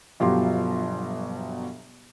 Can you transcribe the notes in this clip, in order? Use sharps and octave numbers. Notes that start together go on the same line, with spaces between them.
G1 B2 F3 F#3 G4 C6